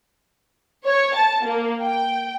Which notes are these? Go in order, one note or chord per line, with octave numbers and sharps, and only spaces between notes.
C#5
A5
A#3
G5